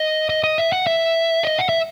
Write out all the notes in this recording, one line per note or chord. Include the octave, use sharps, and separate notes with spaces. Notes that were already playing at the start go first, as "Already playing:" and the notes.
Already playing: D#5
D#5
D#5
E5
F#5
E5
D#5
F#5
E5